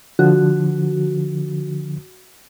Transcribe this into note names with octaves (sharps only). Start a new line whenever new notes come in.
D3 F3 F#4